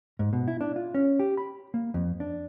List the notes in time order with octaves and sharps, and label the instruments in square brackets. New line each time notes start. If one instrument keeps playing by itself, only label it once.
[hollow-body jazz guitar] G#2
B2
E4
D4
F4
C#4
G4
B5
A#3
F2
D4